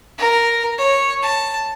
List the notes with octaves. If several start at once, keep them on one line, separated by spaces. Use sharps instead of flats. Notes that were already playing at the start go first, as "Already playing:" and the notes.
A#4
C#5
A5